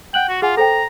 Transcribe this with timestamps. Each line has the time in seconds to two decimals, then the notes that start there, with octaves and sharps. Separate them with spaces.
0.14 F#5 G5 F#6 F#7
0.29 F#4
0.42 F4 G#4 F#5 G#5
0.57 A4 C5 G5 A#5